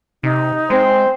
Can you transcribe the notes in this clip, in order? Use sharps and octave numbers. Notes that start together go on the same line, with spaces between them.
C3 D#4
G#3 C4 C5